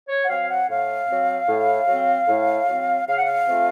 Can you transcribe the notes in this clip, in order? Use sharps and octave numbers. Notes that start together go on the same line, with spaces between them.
C#5
F#5
F#3 C4 F5
F#5
A2 F5
F#3 C4
A2
F#3 C4
A2
F#3 C4
C#3 F5
F#5
F5
F3 A3 C4 F4